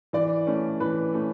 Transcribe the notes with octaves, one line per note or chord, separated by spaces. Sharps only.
E3 D5
A3 C#4
E3 B4
A3 C#4